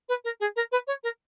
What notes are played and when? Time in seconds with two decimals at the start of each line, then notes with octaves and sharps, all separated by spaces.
0.09 B4
0.24 A#4
0.40 G#4
0.56 A#4
0.72 B4
0.87 C#5
1.03 A#4